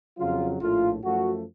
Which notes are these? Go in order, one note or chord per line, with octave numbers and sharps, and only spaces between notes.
F2 C#3 F#3 F4
A#1 A2 A3 F4
F#2 F3 A3 F#4